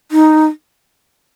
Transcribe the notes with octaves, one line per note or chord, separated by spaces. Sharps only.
D#4